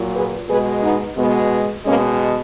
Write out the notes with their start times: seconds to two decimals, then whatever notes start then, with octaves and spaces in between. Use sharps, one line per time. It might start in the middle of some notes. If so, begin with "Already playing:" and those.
Already playing: A#2 F#3
0.15 G#4 B4
0.49 B2 G#3 G#4 B4
0.82 B3 D#4
1.17 B2 G#3 B3
1.85 B2 G#3 A#3 C#4